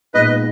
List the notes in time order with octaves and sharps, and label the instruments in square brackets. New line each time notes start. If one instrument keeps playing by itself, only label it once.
[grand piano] A#2 G#3 B3 D#4 [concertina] B4 D#5